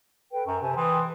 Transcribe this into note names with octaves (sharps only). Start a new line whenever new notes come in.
A4 B4 G5
F#2 A#5 C#6
C3 C5 G#5 A5
E3 G5 C6 D#6